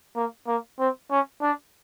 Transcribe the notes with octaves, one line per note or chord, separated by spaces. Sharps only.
A#3
A#3
C4
C#4
D4